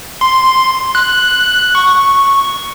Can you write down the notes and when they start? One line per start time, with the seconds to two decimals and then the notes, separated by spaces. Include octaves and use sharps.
0.21 C6
0.95 F#6
1.75 C#6